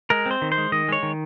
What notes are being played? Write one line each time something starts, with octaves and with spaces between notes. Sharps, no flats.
G#3 A#4
C4 C5
D#3
C5
G#3
D#3 D#5
G#3 C#5
D#3